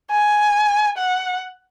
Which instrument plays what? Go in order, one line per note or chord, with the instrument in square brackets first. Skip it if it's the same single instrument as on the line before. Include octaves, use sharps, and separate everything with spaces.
[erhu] G#5
F#5